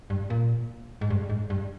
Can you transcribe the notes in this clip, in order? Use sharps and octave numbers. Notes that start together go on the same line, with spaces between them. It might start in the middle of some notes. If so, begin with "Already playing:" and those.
G2
A#2
G#2
G2
G#2
G2